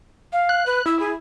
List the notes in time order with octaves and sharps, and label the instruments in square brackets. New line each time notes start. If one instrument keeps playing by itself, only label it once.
[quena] F5
[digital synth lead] F#6
[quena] B4
[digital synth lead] E4 [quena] E6
[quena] G#4